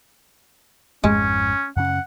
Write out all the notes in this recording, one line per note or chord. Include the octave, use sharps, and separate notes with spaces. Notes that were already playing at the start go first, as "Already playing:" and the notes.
G#1 F2 G#2 G#3 C#4
F#2 C#3 C#4 F#5